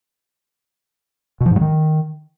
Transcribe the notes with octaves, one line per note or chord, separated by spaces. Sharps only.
B2
F3
G#2
G3
D#3